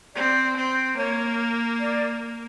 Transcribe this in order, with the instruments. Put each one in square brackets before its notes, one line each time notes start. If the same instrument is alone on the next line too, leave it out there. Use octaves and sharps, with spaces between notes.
[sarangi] C4 [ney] D5
[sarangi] C4
[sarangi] A#3 [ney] C#5
[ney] D5